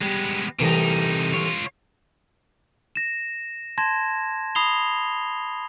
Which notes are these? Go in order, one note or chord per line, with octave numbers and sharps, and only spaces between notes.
G3 G#3 B3
C2 A2 C3 E3 D#4
F4 C#5
A#6 E7
A5 C6 G#6 A#6 E7
B5 D#6 C7 F7 G7